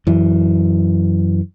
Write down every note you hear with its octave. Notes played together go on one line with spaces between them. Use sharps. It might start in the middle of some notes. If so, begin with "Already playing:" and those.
F#2 E3